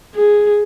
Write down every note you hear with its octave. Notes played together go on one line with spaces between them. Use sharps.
G#4